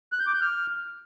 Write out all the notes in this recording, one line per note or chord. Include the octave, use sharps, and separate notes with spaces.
F#6
G6
D6
G6
F6